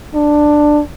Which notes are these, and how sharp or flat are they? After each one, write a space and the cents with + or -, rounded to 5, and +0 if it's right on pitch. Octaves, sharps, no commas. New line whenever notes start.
D4 +10